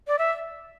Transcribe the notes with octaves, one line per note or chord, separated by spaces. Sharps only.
D5
E5